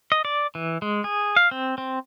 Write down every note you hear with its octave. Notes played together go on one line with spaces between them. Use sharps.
D#5
D5
E3
G#3
G#4
F5
C4
C4